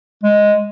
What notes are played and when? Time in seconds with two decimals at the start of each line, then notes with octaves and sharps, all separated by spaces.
0.24 G#3